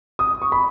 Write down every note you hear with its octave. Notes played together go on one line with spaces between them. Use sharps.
D#6
C#6
B5